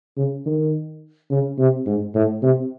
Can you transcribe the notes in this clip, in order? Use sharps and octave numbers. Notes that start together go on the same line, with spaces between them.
C#3
D#3
C#3
C3
G#2
A2
C3